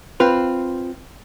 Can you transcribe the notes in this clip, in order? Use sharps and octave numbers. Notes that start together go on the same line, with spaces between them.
C4 F4 B4